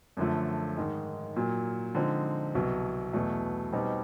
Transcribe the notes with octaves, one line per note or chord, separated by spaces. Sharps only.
F#2 D3 F3 A3
G#2 D#3 G#3
A#2 F#3 A#3
D3 F3 G#3 C4 D#4
C2 B2 F#3
E2 B2 F#3 A3
B2 G3 C4 D#4 G4